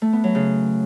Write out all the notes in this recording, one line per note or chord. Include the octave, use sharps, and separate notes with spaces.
A3
B3
F#3
C#3